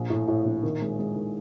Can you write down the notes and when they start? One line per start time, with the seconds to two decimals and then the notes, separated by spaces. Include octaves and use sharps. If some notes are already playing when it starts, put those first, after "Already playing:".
Already playing: A#1
0.10 A2
0.28 A2
0.45 A#1
0.63 D#3
0.81 G#3
0.99 G#3
1.16 D#3